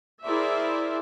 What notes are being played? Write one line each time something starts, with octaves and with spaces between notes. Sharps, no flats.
E4 G#4 A#4 C5 D5 E5